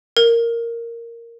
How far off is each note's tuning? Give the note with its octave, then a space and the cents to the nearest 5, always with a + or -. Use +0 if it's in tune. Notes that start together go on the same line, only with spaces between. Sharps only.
A#4 -5